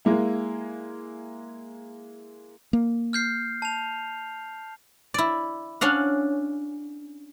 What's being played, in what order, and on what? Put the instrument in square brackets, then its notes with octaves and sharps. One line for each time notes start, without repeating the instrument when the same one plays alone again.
[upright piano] G#3 A#3 E4
[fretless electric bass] A#3
[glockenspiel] F6 G6 C7
A5 F7
[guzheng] E4 D5
C#4 D4 F5 F#5